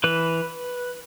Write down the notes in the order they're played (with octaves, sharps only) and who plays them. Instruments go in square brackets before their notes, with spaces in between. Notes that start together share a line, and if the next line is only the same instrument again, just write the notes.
[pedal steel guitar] E3 B4